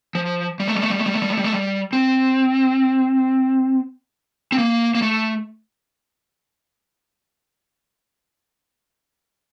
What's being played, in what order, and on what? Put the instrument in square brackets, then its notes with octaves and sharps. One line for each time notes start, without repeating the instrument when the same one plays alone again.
[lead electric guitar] F3
G3
A3
G3
A3
G3
A3
G3
A3
G3
A3
G3
A3
G3
C4
C4
A#3
A#3
A3